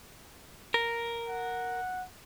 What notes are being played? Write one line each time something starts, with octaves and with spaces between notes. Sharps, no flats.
A#4
F#5